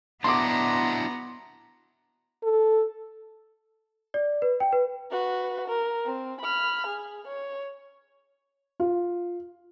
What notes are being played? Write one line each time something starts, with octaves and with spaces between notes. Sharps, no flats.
B3 D4 E4 F#4 A#5 C6 D6
A4
D5
B4
G5
B4
F#4 B4
A#4
C4
B5 F6
G#4
C#5
F4